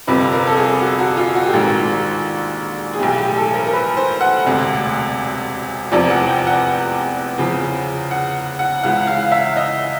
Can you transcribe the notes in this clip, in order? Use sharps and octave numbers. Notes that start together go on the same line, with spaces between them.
G1 F2 C3 B4
A#4
A4
G#4
F#4
F#4
F4
F#4
G4
A#1 G#2 D#3 F#4
G#4
B1 A2 E3 G4
G4
A4
A#4
A#4
B4
C5
F#5
E1 D2 C3
F1 E2 C3 F3 D5
F#5
G5
F#5
E2 C#3 F3
F#5
F#5
C#2 C#3 E3 F#5
F5
E5
D#5